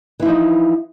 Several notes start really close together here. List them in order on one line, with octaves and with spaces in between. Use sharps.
E3 E4 F3 D#4